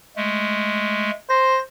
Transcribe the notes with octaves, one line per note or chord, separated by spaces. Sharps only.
G#3 A3
C5 A#6